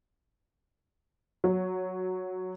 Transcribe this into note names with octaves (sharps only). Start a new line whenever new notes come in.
F#3